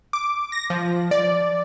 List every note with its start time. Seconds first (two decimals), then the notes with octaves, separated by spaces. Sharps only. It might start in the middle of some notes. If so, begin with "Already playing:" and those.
0.13 D6
0.52 A#6
0.70 F3
1.11 D5